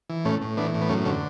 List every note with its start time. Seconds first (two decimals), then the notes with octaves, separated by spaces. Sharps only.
0.10 E3
0.25 A2 A3 C#4
0.42 A2
0.57 E3 B3 D4
0.74 A2
0.81 B3
0.89 F#2 A3 C#4
1.05 D3 A3 C#4